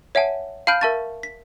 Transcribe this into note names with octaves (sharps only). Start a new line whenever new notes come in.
C#5 E5 F#5 G#5 A5
F5 A5 B5 F6 G6 D7
A#4 E5 A5 C#6 A6
B6